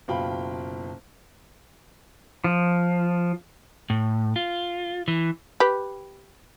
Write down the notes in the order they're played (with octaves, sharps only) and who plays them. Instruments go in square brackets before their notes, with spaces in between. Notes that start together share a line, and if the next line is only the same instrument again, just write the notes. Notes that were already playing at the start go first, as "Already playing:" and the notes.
[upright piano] F#1 B2 F4 F5 G5 B5
[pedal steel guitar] F3
[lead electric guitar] A2
F4
E3
[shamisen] G4 B4